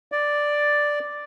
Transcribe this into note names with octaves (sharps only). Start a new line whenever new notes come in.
D5